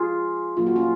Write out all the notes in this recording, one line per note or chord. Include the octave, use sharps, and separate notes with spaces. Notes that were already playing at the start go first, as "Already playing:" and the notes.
Already playing: F4 G#4
A#2 F#3 A#3 F4
F#4
C#4 F4